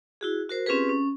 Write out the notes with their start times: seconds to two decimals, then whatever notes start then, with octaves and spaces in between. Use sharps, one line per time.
0.21 E4 F#4 G#4
0.49 F#4 A#4 C5
0.66 C4 C#4 F4 G4 G#4 B4
0.89 C#4